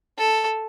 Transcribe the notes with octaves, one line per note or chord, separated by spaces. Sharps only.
A4